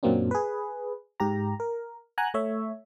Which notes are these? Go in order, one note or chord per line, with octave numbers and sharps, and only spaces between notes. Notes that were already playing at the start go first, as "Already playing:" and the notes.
F#2 A#2 F#3 A#3 C4 D4
G#4 B4
G#2 G4 A#5
A#4
F#5 G#5 A#5 F#6
A3 C#5 E5